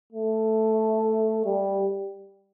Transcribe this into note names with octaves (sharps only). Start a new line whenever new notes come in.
A3
G3